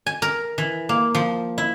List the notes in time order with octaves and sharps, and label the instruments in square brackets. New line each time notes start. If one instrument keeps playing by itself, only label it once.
[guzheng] G#5
A#4
E3
A#3
F3
E4